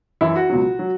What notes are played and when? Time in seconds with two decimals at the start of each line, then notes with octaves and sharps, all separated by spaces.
0.21 F#2 E3 E4
0.36 F#4
0.50 C#2 B2 F#3
0.79 F#3